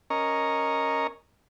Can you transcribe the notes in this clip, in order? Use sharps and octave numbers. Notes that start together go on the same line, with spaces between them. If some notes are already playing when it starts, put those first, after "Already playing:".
C#4 A#4 D#5 A#5 C#6